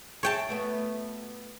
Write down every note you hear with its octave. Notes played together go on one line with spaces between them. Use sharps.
E4 G#4 A4 C#5 G5 A5
A3 B3 F#4